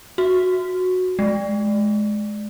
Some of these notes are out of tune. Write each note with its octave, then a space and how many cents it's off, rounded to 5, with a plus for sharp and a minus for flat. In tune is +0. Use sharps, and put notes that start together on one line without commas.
F#4 -10
G#3 +25